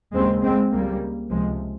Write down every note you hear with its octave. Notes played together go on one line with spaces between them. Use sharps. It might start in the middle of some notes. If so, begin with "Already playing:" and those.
D#2 C#3 G#3 C4
G#3 C4
C#2 C#3 G3 A#3
C#2 C3 F3 G#3